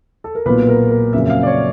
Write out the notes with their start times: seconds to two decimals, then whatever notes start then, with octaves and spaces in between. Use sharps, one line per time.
0.24 A4
0.35 A#4
0.45 B1 A#2 F#3 B3 B4
0.62 B4
0.68 A#4
0.91 A#4
1.13 F2 C#3 F#3 A#3 C#4 E5
1.26 E5
1.30 F5
1.43 D5
1.47 C#5